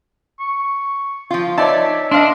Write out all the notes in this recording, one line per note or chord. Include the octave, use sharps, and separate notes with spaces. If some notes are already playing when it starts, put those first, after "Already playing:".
C#6
F3 F4
D#4 C#5 D5 E5 A5
D4 D#5 F5 C6